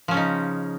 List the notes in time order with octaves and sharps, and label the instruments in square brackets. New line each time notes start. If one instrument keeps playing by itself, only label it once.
[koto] F3
C#4
C#3
D#4